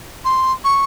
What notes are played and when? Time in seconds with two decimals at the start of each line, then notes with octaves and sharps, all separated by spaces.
0.25 C6
0.64 C#6